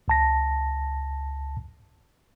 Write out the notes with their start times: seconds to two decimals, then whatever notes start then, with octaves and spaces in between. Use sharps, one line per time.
0.08 C#2 A5 A#6